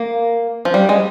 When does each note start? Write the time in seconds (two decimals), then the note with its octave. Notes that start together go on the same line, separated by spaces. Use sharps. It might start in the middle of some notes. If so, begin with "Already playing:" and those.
Already playing: A#3
0.65 F3
0.74 G3
0.89 G#3